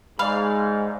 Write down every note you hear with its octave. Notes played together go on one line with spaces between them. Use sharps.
G#2 G#3 D5 F5 B5